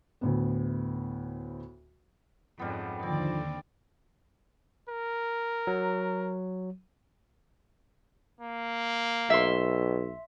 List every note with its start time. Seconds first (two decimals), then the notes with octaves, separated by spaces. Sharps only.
0.21 D2 A2 B3
2.59 F2 G#2 C#3 G3 B3
3.03 D#2 D3 D#3 F3 C4 D5
4.89 A#4
5.67 F#3
8.41 A#3
9.30 B1 E5 C6